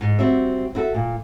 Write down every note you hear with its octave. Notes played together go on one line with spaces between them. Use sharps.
G#2
G3 C4 F#4 E5
E4 F#4 A4 E5
A#2